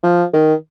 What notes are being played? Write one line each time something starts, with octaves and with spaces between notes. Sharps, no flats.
F3
D#3